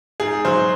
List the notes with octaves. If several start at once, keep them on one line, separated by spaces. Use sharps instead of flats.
G#2 G#4
F#3 C5